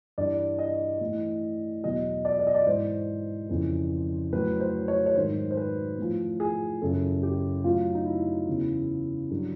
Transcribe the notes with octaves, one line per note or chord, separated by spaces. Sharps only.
G2 E3 D5
D#5
A2 E3
E2 B2 F#3 D#5
D5
D#5
D5
D#5
D5
G#2 E3 C5
F2 C#3 E3
A2 F#3 B4
C5
C#5
C#5
G#2 D#3 F#3 C5
C5
B4
A2 F3
G#4
F#2 C#3 E3 A4
G4
A2 F#3 F4
D#4
E4
E2 C#3 E3
G2 D3 F#3